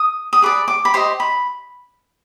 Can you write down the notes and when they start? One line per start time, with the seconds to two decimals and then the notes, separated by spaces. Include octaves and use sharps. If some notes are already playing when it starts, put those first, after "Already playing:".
Already playing: D#6
0.33 D#6
0.42 G#4 B4 D5 D6
0.68 D6
0.85 B5
0.94 G4 C5 D#5 C6
1.20 B5